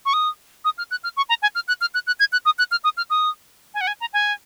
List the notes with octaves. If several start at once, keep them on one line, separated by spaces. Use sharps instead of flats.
C#6
D#6
D#6
F6
F#6
F6
C#6
A#5
G#5
F6
F#6
F6
F#6
F#6
G#6
F#6
D#6
F#6
F6
D#6
F6
D#6
G#5
F#5
G#5
A#5
G#5